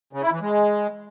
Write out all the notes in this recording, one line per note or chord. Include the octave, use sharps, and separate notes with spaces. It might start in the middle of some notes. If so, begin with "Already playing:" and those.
C#3
E4
E3
G#3